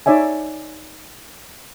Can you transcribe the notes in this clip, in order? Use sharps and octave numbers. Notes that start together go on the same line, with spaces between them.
D#4 C#5 D5 E5 G#5